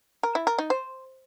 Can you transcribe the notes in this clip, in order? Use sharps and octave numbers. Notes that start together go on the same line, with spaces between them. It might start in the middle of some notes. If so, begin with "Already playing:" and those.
A#4
E4
A#4
D#4
C5